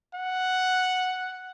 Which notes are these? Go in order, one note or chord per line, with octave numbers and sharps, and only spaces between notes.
F#5